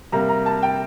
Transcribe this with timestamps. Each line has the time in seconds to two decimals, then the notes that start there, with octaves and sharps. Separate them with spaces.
0.12 C3 G3 A#3 A#5
0.29 A#5
0.46 A5
0.63 G5